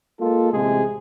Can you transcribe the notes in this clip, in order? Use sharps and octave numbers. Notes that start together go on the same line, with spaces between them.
G#3 A#3 F4 A4
A1 C3 G#3 G#4